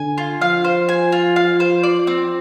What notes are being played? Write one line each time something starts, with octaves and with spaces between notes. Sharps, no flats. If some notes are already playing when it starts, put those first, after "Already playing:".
Already playing: D3 G#5
F4
F3 F5
C5
G#5
F4
F5
C5
D5
C4